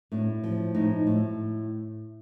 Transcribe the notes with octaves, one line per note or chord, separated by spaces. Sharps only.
A2 D4
F3
A2 D#4
A2